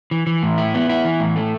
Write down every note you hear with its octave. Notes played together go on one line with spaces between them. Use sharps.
E3
E3
A2
E4
B3
E4
E3
A2
A3